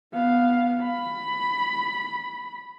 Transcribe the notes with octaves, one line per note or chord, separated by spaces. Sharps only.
B3 F5
B5